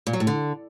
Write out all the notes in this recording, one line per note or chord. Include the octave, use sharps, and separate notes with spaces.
A#2
F#3
A2
D3